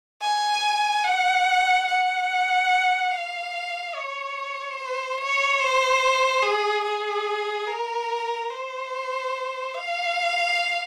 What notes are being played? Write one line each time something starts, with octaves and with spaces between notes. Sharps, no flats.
G#5
F#5
F#5
F5
C#5
C5
C#5
C5
G#4
G#4
A#4
C5
F5